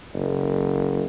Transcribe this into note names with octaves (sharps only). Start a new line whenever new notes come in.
F#1